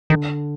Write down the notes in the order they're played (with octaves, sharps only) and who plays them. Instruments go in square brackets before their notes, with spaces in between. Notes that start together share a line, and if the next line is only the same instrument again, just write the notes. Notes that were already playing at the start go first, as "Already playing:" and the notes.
[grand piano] D3 [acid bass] D#3